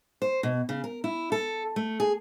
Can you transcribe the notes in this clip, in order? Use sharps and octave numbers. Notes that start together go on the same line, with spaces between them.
C5
B2
C#3
A#4
E4
A4
A3
G#4